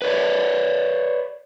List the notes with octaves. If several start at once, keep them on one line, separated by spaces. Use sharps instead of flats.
B4 C#5 D5